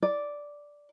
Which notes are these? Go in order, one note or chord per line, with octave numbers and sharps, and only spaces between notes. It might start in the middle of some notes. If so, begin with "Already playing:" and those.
D5